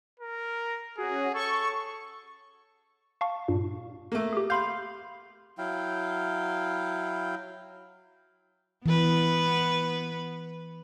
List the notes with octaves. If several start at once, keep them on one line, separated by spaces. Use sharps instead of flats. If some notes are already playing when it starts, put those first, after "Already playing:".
A#4
C#4 F#4 G#4
A4 C#6
F5 A5 C#6
G2 A#2
A3 A#3
G4 G#4
F5 B5 C6 G6
F#3 E4 F5 G5
E3 B3 B4